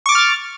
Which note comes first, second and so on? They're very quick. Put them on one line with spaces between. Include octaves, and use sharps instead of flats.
C#6 D6 A6 F6